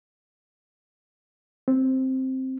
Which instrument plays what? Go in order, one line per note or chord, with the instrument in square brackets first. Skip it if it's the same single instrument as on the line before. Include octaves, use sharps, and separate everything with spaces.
[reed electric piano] C4